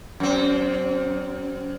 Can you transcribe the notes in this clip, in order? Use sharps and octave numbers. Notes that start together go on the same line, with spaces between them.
F#2 C4